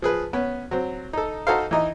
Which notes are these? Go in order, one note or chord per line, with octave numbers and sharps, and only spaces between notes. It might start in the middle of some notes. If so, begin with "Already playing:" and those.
F3 G#4 B4
B3 C#4
F#3 C4
D#4 A4
D#4 F#4 A4 C5 F5
E3 D#4 D#5